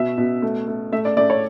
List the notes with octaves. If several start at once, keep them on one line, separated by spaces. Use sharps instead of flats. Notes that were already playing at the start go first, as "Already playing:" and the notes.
Already playing: B2 E5
B2
A3
A3
A3 E5
D5
A3 D5
C#5